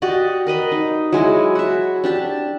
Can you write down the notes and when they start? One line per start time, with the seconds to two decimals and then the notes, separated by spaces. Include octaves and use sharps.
0.02 F#4 G4 D5 D#5
0.47 A#4 B4 D#5 B5
0.72 D#4
1.12 F#3 G#3 E4 G#4
1.55 F#4 E5
2.04 D4 G4 A5